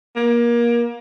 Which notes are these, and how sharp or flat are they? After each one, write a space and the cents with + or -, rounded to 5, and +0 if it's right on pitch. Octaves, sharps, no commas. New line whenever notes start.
A#3 +25